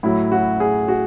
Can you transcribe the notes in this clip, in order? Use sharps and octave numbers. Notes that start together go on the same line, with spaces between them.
A2 F#3 E4
F#4
G#4
F#4